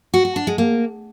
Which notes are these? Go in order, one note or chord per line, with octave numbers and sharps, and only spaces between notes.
F#4
F#4
D4
G#3
A#3